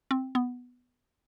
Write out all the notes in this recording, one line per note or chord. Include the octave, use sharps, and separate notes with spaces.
C4
B3